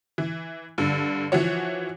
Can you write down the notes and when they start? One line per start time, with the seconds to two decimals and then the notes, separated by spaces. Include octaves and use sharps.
0.18 E3
0.78 G2 D3
1.32 E3 F3 F#4 C#5